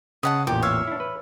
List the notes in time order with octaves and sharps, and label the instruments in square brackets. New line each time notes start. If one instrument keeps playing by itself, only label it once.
[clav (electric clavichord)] C#3 [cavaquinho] D#5 F#5 A5
[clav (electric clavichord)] A1 E2 A#2 [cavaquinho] G4
[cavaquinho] C#5 E5 F5
[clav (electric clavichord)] D4 E4
B4